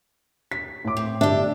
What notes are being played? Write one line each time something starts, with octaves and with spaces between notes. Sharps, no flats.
D#2 B6
A2 D6
C4
G1 D4 G4 E5